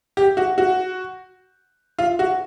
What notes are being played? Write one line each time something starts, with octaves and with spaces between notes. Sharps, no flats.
G4
F#4
F#4
F4
F#4